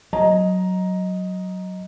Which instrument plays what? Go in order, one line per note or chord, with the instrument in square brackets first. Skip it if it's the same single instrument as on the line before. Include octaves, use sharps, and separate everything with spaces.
[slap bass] F#3 [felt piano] D#5 A#5